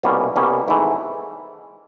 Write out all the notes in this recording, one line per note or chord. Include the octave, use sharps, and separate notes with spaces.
C2 B2 G3 A#3 C#4 F4
C2 B2 G3 A#3 C#4
G#1 G#2 E3 A3 E4